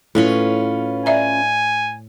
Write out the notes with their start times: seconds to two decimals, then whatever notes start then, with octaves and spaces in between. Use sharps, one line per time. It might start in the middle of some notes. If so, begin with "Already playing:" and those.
0.15 A2 C#4 F4 B4
1.06 D5 E5 G#5 A#5